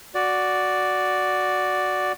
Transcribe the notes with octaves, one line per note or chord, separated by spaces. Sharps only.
F#4 D5